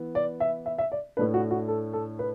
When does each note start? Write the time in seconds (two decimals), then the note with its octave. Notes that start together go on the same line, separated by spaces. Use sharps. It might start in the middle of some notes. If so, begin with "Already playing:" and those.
Already playing: E3 B3
0.15 D5
0.40 E5
0.66 E5
0.78 E5
0.92 D5
1.17 A2 A3 D4 B4
1.34 F#4
1.51 F#4
1.68 A4
1.93 A4
2.19 B4